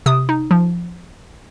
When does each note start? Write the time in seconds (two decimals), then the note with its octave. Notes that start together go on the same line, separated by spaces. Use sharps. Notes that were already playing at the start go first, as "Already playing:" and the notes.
0.06 C3 D#6
0.29 D#4
0.51 F3